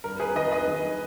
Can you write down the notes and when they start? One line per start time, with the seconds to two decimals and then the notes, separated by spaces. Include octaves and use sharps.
0.04 G2 A#4
0.20 G#4 B4
0.35 D#3 B4 D#5
0.52 B4 D#5
0.68 D#3